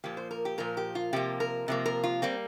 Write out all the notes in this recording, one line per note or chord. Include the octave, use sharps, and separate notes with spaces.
A#2 F3 A#3 G4
C5
A#4
G4
A#2 F3 A#3 A#4
G4
F4
C3 F3 A#3 G4
A#4
C3 F3 A#3
A#4
F4
G3 A#3 C4